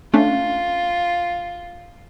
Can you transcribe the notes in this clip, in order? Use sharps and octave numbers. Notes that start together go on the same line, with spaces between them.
A3 C#4 D4 F4